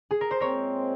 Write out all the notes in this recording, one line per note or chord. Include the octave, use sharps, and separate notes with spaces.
G#4
A#4
C5
A#2 G#3 C4 A#4 C#5